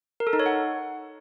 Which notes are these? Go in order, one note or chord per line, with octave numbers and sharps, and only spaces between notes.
A#4
A4
D#4
C#5
F#5